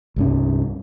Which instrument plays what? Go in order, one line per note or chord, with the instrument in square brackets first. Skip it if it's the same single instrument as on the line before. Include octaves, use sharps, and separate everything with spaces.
[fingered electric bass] C2 G2 C#4